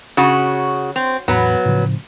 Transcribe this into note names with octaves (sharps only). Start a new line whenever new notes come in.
C#3 F#4
C4
E2 A2 F#3 B3
A2 C#3 F3